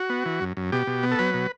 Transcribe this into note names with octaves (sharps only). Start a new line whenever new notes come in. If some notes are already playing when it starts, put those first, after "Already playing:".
Already playing: F#4
B3
E3
F#2
F#2
B2 G4
B2
B3
A4
F#3 B4
B2